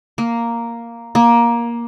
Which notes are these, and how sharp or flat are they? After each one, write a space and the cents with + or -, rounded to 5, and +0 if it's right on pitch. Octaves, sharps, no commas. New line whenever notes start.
A#3 +0
A#3 +15